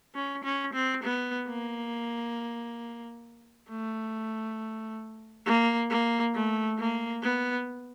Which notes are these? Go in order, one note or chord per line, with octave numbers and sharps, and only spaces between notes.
C#4
C#4
C4
B3
A#3
A3
A#3
A#3
A3
A#3
B3